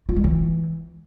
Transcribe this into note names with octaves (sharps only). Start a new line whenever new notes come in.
F4
G3
E3